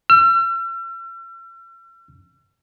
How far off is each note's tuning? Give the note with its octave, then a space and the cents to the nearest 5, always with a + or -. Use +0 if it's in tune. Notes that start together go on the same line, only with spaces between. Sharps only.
E6 +45